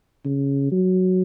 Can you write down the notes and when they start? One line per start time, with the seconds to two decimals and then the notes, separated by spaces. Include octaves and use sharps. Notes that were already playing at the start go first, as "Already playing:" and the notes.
0.25 C#3
0.72 F#3